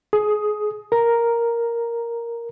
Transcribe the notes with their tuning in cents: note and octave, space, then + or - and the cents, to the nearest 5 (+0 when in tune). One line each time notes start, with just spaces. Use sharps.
G#4 +25 D#6 +5
A#4 +0 A#5 +0